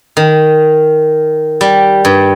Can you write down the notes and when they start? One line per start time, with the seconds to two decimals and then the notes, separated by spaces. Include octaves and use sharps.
0.17 D#3
1.61 G3
2.05 G2